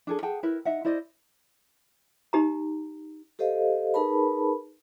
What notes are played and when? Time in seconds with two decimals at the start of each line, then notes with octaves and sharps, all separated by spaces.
0.07 D4 G#4 A4
0.23 G#4 F#5 G5 A5
0.43 E4 A#4 B4
0.65 D#4 E5 F#5
0.85 E4 C5 D5 D#5
2.33 D#4 G4 A#5
3.39 G4 A4 C5 D#5 F5
3.94 D#4 G#4 A#4 B4 A5 B5